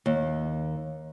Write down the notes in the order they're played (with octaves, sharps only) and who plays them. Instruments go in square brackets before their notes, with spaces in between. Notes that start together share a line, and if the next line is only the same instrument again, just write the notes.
[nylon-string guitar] D#2